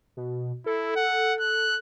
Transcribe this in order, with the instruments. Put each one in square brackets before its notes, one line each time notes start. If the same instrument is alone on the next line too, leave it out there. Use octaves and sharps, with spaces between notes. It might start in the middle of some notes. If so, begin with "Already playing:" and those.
[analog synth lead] B2
[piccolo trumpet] E4 [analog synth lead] A4
[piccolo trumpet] F#5
F#6